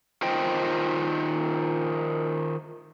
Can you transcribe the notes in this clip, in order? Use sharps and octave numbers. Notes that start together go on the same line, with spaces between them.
D#3 F4 C5 D#5 G5